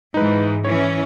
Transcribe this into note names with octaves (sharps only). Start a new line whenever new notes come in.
G#2 E3 D#4 B4
E3 C#4 C#5